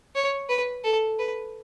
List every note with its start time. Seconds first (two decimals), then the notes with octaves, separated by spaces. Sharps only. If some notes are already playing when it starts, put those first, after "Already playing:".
0.15 C#5
0.49 B4
0.84 A4
1.19 B4